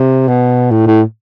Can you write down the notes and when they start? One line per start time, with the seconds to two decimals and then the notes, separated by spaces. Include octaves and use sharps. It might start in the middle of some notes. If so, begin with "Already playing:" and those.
Already playing: C3
0.28 B2
0.71 A2
0.86 A2